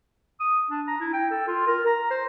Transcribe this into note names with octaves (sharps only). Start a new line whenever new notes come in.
D#6
D4
A#5
E4
G5
A4
F4
A#4
A#5
C5